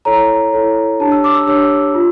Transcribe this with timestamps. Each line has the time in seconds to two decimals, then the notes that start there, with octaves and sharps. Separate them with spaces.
0.05 E4 A4 C#5 A#5
0.52 E4 A4 C#5
1.00 D4 G4 C#5 A5
1.12 E6
1.24 D6
1.35 E6
1.47 D4 G4 C#5 E6
1.94 F4